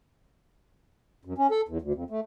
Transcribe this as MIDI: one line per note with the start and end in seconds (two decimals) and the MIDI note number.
1.25 1.34 42
1.38 1.47 61
1.51 1.61 69
1.68 1.78 40
1.82 1.93 38
1.94 2.04 41
2.10 2.20 57